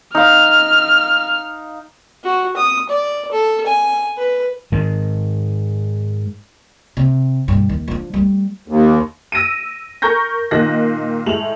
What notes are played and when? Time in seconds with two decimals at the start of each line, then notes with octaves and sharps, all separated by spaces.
0.15 D#4 F5 F6
2.24 F#4
2.57 D#6
2.89 D5
3.32 A4
3.66 G#5
4.18 B4
4.72 G#2 D#3 G#3
6.97 C3
7.48 G2 B2
7.69 D#2
7.88 F3 D4
8.14 G3 A3
8.68 D#2
9.32 E6 A#6 D7 D#7
10.02 A#4 A#5 C#6 G6 A#6
10.51 A#2 D#3 D#5 F#6 A#6
11.26 A2 G#3 F7 F#7